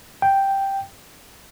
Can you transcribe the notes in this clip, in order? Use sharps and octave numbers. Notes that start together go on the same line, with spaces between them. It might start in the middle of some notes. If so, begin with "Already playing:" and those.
G5